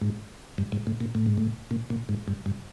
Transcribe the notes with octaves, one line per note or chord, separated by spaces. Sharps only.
G#2
G2
G#2
A2
A#2
A2
G#2
A2
A#2
A#2
G#2
G2
G2